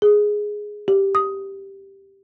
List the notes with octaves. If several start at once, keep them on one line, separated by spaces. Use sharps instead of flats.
G#4
G4
D#6